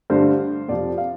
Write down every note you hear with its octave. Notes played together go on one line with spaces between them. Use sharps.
G2 D3 A3 C5
F2 C3 F3 D5
F5